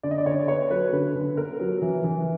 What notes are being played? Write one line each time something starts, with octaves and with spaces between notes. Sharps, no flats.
D3 D5
D#5
D5
D3 C#5
B3 C#5
F#3 B4
D3 B4
D3
B3 A#4
F#3
E3
E3